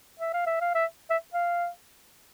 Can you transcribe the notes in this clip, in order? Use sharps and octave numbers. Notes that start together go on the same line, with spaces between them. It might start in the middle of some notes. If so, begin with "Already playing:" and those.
E5
F5
E5
F5
E5
E5
F5